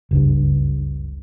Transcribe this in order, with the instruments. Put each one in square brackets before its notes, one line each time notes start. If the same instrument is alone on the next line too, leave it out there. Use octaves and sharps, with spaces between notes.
[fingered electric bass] F#1 C#2 G2